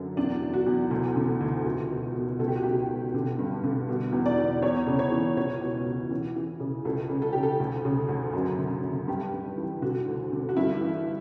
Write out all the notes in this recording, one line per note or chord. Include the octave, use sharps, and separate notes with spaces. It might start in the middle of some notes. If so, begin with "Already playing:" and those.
Already playing: F#2 D3
E2 D4
E2
F#4
E2
D2
D3
D2
C#2
B2
B2
C#2 A4
G4
F#4
C#2 G4
B2
D3
G2
D3
B2
E2
D5
E2
E2 C#5
C#3
C#5
E3
C#2 C#5
B2
C#2
E3
E3
C#3
C#2 A4
C#3
A4
C#3 G4
A4
D2
C#3
D2
F#2
D3
D3
G2 G4
G2
E3
D3 F#4
D2
D3
F#4
G2 E4
E3